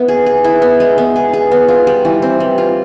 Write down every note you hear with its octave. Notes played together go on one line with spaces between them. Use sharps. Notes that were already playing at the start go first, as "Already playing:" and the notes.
Already playing: B3 E4
G#4
G#4
E4
B3
G#3
B3
G#4
G#4
B3
F4
G3
E3
C4
G3
F4